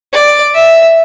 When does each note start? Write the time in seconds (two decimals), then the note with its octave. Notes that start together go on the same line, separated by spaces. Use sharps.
0.13 D5
0.55 E5